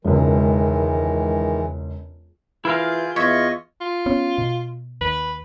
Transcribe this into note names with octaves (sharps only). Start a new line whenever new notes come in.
E1 C#2 D#3 E3 G#3
E3 E4 F4 G#4 A#4 F5 G6
E2 F4 C#5 D#5 E5 C#6
F4
B3 C#4
B2
D#2 B4